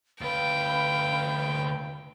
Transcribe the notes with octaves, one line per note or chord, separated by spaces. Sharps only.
D2 B4 F5 G5